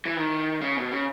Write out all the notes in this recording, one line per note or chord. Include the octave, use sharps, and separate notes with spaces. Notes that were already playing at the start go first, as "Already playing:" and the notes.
E3
D#3
C#3
B2
C#3